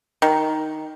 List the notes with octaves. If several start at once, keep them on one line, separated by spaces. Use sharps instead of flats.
D#3